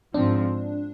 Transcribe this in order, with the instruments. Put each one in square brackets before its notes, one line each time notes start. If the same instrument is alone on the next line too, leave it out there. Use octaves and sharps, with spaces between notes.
[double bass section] G#2 F3 C4 [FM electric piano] D4